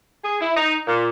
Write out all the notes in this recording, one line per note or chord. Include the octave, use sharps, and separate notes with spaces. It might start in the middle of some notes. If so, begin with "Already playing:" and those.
G#4
E4
D#4
A#2